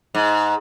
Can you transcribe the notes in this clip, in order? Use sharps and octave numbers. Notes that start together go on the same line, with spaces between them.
G#2